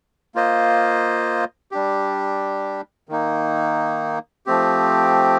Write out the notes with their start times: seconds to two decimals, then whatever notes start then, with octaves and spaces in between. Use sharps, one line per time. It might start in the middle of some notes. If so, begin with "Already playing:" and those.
0.35 A#3 F4 C5 D#5
1.72 G3 D4 G4
3.09 D#3 A#3 D#4
4.46 F3 A3 C4 G4